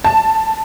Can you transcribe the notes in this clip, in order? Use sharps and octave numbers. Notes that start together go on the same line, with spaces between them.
A5